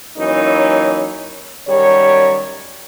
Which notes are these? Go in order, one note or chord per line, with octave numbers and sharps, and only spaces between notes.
E3 F#3 A#3 C#4 D#4
F#2 D#3 G3 C#5